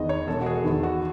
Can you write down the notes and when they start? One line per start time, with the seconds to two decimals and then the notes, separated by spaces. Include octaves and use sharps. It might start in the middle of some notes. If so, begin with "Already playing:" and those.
Already playing: E2 D#3 D#5
0.09 C#5
0.27 E1 A4
0.41 F#4
0.46 G#4
0.64 E2 D#3
0.83 F#4